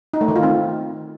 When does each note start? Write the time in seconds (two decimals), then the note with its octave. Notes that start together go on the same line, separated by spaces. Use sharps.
0.14 D#4
0.21 A3
0.28 D#3
0.36 F4
0.43 C4